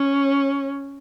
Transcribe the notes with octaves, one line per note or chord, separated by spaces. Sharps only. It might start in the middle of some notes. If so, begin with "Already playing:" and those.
Already playing: C#4